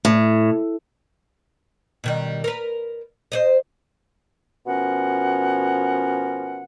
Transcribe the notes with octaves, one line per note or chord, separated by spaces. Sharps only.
A2
B2 D#3 G3
A#4 B4
C5 D5 D#5
B2 F3 C#4 A#4 F#5